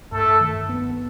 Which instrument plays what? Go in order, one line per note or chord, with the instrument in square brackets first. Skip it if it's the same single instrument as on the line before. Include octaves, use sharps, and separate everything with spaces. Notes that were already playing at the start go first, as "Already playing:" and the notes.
[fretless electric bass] G2 [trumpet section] A3 A4
[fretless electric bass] D#3
B3